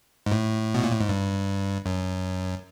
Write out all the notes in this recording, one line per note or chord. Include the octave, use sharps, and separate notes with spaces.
G#2
A2
B2
A#2
A2
G#2
G2
F#2